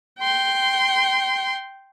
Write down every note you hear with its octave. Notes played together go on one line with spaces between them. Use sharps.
G5 C6